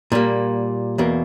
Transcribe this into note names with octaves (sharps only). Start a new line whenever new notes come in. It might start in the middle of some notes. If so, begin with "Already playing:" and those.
A#2 G3 A#3
E2 B2 A#3